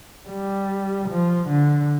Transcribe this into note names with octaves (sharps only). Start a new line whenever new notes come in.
G3
F3
D3